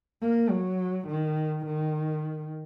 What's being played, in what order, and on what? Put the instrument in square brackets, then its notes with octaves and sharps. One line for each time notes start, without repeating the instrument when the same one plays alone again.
[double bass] A#3
F#3
D#3
D#3